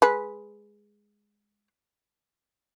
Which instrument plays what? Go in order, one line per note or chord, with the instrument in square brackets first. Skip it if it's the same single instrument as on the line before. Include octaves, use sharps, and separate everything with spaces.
[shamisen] G#3 B4